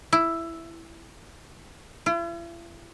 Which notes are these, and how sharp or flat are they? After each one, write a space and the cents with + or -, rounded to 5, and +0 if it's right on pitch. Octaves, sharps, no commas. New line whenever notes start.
E4 +5
E4 +45